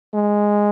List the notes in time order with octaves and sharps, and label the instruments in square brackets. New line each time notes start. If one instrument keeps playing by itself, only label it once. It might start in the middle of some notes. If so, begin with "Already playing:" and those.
[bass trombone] G#3